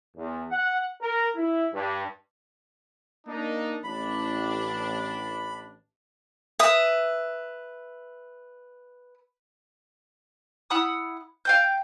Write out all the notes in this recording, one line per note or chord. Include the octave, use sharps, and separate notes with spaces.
E2
F#5
A#4
E4
G2
A#3 D4 D#4
A1 D4 B5
B4 E5 D#6
E4 F#5 B5 D#6
F5 G5 G6